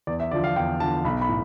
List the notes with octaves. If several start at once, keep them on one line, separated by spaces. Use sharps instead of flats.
E2 D5
E5
D3 F3 D5
F5
E2 G5
D3 F3 A5
B1 B5
B5
A2